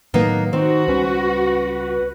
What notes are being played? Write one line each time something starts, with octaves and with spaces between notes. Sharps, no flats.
A2 D#3 F#3 A#3 B3 D#4
D#3 C4 D#4 F#4
C#2 G3 C#4 B4